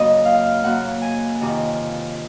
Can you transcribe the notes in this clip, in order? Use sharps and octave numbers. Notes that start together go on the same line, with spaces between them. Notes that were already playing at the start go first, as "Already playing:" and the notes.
Already playing: F#2 C#3 F#3 A#3 D#5
F5
F#2 C#3 F#3 A#3 F#5
G#5
F2 C3 D#3